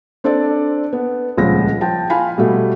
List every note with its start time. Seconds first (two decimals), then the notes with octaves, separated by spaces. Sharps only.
0.24 C4 D4 A4 C5 D5
0.93 B3
1.37 D#1 C#2 F3 A#6
1.81 F3 G5 A5
2.10 F4 F5 G#5 B5
2.38 B2 G3 A3